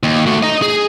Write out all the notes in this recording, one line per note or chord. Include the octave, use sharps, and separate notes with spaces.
D#2
A3 F#4
D#5 A#5
G#4